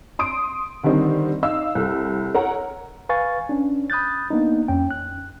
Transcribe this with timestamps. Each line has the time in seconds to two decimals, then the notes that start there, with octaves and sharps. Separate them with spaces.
0.19 C6 D#6 D7
0.83 D3 D#3 G3 C4 D#4
1.43 D#4 F5 E6
1.75 C2 A4
2.34 A#4 C#5 F#5 A#5
3.09 B4 F5 G#5 C#6 A6
3.49 C#4 D4
3.90 B5 D#6 F#6 G6 A6
4.30 A#3 B3 D4 D#4
4.68 F2 C#4 G5
4.91 F#6